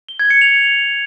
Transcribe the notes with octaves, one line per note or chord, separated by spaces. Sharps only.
G7
G#6
C#7
F7